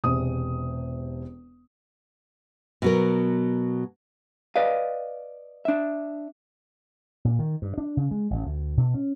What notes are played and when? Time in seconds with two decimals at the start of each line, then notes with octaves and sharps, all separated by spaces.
0.04 E1 C3 D#6
2.82 B2 F#3 A#4
4.56 B4 D5 D#5 F5
5.65 D4 E5
7.25 A#2
7.39 D#3
7.62 G2
7.78 D4
7.97 C#3
8.11 G#3
8.30 A1
8.45 D2
8.77 B2
8.94 C#4